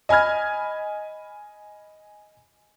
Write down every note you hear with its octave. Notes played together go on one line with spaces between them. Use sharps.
D#5 G#5 B5 F6 G#6